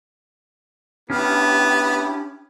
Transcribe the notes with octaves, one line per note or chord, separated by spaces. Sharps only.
B3 C#4 D4 E4 G4 F6